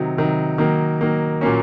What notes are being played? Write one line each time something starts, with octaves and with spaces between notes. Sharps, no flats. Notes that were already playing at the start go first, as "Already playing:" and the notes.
Already playing: C3 D#3 F#3
C3 D#3 F#3
D#3 F#3 A#3
D#3 F#3 A#3
A#2 F#3 A#3 C#4